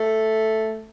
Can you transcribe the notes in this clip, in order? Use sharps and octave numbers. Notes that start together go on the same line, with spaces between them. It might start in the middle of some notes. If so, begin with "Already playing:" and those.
Already playing: A3